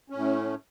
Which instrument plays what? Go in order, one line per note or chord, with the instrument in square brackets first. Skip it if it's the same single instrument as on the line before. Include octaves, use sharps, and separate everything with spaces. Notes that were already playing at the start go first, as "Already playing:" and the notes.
[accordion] C#4
A2
A3